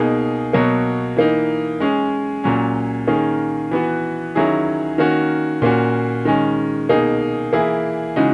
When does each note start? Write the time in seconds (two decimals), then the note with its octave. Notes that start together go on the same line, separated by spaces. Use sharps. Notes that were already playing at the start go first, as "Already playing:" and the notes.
Already playing: B2 A#3 D#4 G#4
0.53 B2 F#3 A#3
1.17 E3 A#3 D#4
1.80 G#3 C#4 G#4
2.44 A#2 F#3 C#4
3.07 D#3 A#3 C#4 G#4
3.71 E3 B3 F#4
4.35 D#3 F#3 C#4 E4 G#4
4.98 D#3 A#3 C#4 F#4
5.62 A#2 A#3 C#4 F#4
6.25 D#3 G#3 C#4
6.89 B2 A#3 D#4 G#4
7.53 E3 A#3 E4 G#4
8.16 C#3 E3 G#3 D#4 F#4